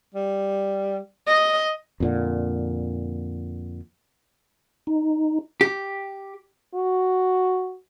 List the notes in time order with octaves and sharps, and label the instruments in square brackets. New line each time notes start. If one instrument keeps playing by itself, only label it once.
[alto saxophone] G3
[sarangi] D#5
[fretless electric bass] F2 A#2 D3
[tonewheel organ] D#4
[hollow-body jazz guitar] G4
[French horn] F#4